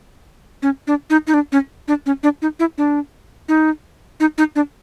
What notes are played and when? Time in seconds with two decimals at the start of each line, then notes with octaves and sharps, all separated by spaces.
0.62 C#4
0.87 D4
1.10 D#4
1.27 D#4
1.34 D4
1.52 C#4
1.88 D4
2.06 C#4
2.23 D4
2.42 D#4
2.60 E4
2.78 D4
3.49 D#4
4.20 D#4
4.38 D#4
4.56 D4